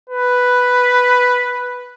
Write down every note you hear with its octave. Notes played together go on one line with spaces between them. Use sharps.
B4